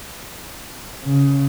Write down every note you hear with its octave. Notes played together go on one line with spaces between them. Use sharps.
C#3